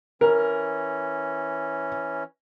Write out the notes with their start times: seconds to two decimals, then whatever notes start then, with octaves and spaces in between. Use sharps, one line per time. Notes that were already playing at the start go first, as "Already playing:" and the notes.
0.21 E3 C#4 A#4